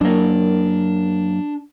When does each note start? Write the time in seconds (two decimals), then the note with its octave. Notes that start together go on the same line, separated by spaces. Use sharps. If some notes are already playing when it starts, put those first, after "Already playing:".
0.01 F#2 A#3 D4